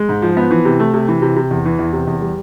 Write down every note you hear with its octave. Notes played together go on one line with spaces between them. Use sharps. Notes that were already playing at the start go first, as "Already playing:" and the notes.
Already playing: G#3
G#2
F3
B3
E3
C3
A3
C3
E3
C3
C3
E2
E3
E2
C3
E2
G3